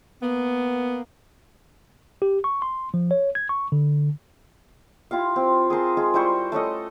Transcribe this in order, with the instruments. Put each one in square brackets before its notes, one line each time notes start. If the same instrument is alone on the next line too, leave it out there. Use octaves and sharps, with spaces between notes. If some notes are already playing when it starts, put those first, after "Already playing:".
[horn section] A#3 B3
[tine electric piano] G4
C#6
C6
F3
C#5
G#6
C#6
D3
[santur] E4 F4 G4 F5
C4
G#4 A#4 C5 A5
G#3 F4 G#4
G3 E4 C5 C#6
A3 C#4 A4 D#5